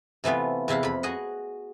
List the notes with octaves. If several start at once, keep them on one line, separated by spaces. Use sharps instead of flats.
C3 E3 A3 B3 F4
E2 C3 E4 F5 F#5
F2 B5
F#4 G#4 D#5 F#5